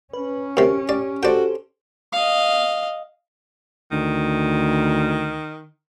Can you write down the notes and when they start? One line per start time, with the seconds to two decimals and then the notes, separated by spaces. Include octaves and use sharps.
0.13 C#4 B4
0.57 F#2 C3 G4 C#6
0.89 G4 D5
1.23 F#4 G4 A4 C5 D5 G5
2.12 D#5 F5
3.92 D2 D#3